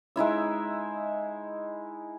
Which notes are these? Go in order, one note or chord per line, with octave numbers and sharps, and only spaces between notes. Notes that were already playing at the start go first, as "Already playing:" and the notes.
G#3 D#4 E4 E5